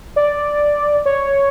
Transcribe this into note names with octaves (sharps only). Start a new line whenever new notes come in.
D5
C#5